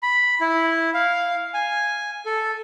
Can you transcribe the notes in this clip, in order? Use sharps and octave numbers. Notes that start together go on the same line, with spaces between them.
B5
E4
F5
G#5
A4